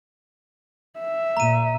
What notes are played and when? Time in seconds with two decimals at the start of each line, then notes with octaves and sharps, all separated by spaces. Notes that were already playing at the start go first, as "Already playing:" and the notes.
1.00 E5
1.37 A#2 A#5 D#7